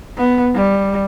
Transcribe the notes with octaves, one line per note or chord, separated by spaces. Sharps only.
B3
G3